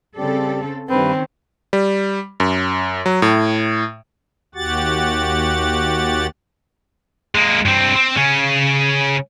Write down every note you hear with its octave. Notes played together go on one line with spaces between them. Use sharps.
C#3 G3 C4 G4 A4
G2 D#3 C4 C#4 B4
G3
F#2
F#3
A2
D#2 F#4 G4 F#5 A6
G#3 A#3
G2 C4
C4
C#3 C#4